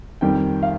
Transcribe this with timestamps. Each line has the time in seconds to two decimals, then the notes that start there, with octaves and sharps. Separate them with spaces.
0.21 F2 D#3 G3 G5
0.63 F5